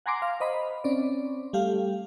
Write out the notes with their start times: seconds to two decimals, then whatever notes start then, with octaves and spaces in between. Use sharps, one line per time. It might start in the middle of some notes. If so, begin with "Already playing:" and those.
0.06 F#5 G#5 A#5 C6 D6
0.22 F5
0.40 C5 D#5 B5
0.84 C4 C#4 D5
1.53 G3 A3 G4 F5